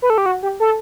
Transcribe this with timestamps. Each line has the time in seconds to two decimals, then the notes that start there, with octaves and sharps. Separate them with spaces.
0.02 B4
0.10 A4
0.18 G4
0.26 F#4
0.43 G4
0.60 A4